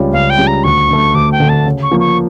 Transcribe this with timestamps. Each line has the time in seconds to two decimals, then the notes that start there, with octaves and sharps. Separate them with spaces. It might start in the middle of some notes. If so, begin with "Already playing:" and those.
Already playing: C#2 C#3 G3 C#4 F4
0.13 C#2 F5
0.30 G5
0.38 C#3 G3 C#4 F4
0.47 A#5
0.64 D2 C#6
0.89 D3 A3
1.14 D2 D6
1.32 G5
1.40 D3 A3
1.49 A5
1.66 C#3
1.83 C#6
1.91 F3 A#3
2.00 C#6